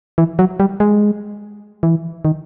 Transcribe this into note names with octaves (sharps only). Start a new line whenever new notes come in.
E3
F#3
G3
G#3
E3
D#3